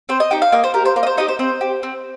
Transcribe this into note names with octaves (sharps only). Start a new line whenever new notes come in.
C4 C5
D#5
D#4 G4 G5
F5
A#3 D#5
C5
G4 A#4
C5
A#3 C5
D#5
C5
D#4 G4 D#5
C5
C4 C5
G4
C4